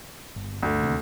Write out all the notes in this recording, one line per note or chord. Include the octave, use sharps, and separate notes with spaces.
G1
D2
D#2 C3